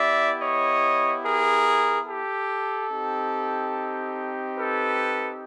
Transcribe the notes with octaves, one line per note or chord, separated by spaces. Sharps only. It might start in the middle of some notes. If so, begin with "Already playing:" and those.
Already playing: B3 E4 G4 D5 E5
C#5 D#5
G#4 A#4
G4 A4
C4 D#4 G4
A4 B4